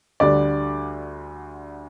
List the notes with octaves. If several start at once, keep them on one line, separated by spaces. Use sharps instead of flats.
D2 D3 G3 D5